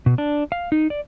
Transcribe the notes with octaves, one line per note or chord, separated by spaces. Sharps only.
B2
D4
F5
D#4
D5